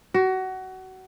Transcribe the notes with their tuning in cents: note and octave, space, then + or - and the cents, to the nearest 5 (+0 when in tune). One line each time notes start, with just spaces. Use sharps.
F#4 +25